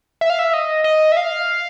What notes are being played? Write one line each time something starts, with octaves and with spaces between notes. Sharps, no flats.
E5
F5
E5
D#5
D#5
E5
F5